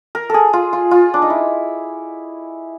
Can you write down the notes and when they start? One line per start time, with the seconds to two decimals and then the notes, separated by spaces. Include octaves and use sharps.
0.15 A#4
0.30 G#4 A4
0.53 F4
0.73 F4
0.91 F4
1.14 D4
1.22 D#4
1.30 E4